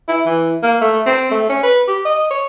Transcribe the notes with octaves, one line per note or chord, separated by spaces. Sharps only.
E4
E3
A#3
A3
C4
A3
C#4
B4
G4
D#5
C#5